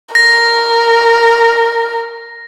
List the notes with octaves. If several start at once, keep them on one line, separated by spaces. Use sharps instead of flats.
A#4 A#6